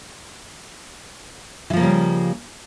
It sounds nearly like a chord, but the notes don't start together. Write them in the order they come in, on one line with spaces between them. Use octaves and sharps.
E3 F3 A#3 C#3 G3